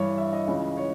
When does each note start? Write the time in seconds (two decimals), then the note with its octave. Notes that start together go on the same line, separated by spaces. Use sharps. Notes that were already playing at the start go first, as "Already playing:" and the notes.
Already playing: G2 E3 C#5
0.18 E5
0.33 D#5
0.48 C#2 C#3 E3 D#5
0.77 C#5